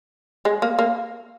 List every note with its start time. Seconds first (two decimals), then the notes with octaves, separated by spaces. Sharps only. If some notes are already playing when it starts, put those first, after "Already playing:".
0.45 G#3
0.62 A#3
0.79 A#3